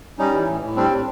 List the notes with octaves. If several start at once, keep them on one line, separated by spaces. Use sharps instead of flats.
G3 C#4 D#4
E3
A2
A2
G3 C4 D4
A2